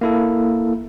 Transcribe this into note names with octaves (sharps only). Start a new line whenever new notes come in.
A#3 E4 A4